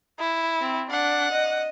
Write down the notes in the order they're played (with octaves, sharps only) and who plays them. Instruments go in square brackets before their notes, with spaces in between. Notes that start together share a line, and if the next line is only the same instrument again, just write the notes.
[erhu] E4
[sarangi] C4
[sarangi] D4 [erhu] F#5
[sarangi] D#5